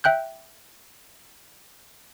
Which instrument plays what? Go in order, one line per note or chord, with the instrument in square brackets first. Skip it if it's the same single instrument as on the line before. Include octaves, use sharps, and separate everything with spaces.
[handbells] E5 G5 F#6 G6